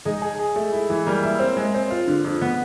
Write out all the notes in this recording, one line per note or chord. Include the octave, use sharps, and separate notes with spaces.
G#3 D#4
G#4
G#4
A3
E4
E3
G3 A#3
E4
C4
G#3
C4
F4
D3
F2
B3